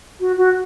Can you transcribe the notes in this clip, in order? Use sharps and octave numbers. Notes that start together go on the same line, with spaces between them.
F#4
F#4